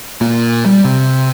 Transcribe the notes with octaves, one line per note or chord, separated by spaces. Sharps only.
A#2
G3
C3